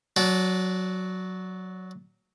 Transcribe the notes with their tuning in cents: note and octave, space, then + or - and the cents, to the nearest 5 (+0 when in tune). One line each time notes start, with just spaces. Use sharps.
F#3 +0 D4 -20